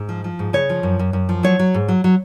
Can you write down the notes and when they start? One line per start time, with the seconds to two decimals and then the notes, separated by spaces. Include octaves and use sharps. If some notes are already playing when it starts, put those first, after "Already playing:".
Already playing: G#2
0.09 F3
0.24 F3
0.39 G#2
0.53 C#3 C#5
0.69 F3
0.83 F#2
0.99 F#2
1.13 F#2
1.29 F3
1.43 F#3 C#5
1.59 F#3
1.74 G#2
1.88 F#3
2.04 F#3